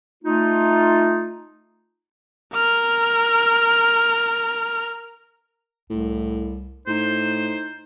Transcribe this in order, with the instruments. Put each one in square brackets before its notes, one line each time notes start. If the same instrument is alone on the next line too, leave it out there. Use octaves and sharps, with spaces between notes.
[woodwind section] A3 D#4 F4
[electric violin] A#4 F6
[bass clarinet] C2 [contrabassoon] A2
[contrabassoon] A2 [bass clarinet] D#4 [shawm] C5